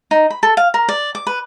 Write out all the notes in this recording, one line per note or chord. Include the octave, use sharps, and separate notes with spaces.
D#4
B5
A4
F5
A#4
D5
D6
B4